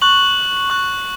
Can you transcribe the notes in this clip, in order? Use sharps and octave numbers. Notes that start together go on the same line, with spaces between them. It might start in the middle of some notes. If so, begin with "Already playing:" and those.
C#6 F#6 F#7
C#6 F#6